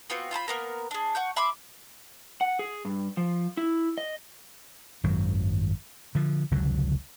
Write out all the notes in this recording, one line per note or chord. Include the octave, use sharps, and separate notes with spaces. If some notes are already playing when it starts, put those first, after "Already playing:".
B3 C4 F4 F#4
F4 C5 A5 B5
A#3 B3 A#4
D4 G#4
F#5 C#6 G6
E5 B5 C6 D6
F#5
G#4
G2
F3
E4
D#5
G#1 F#2 D#3 F#3
D3 F3
F1 C#2 D3 F#3